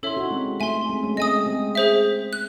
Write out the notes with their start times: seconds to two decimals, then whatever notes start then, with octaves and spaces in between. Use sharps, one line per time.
0.03 C#4 E4 A4 C#5 E5 C6
0.17 D#4 F#4
0.31 G#3 C4
0.60 A3 E5 G#5 C6
0.89 G#3 C4
1.03 A3 C#4
1.17 G#3 C4 D#5 G#5 D#6
1.46 G#3 C4
1.75 G#4 C5 E5
2.33 F#6